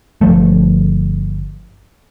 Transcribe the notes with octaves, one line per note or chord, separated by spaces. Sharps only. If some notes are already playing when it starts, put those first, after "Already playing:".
G1 F3 A3